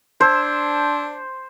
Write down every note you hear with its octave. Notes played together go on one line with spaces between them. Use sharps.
D4 C5 A5 E6 G#6